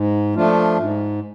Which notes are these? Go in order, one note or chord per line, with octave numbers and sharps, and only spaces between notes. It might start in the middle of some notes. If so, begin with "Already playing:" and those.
Already playing: G#2
F3 A3 D4 F4
G#2